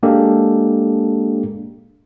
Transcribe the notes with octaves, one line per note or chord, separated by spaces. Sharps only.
G#3 A#3 D4 G4 A4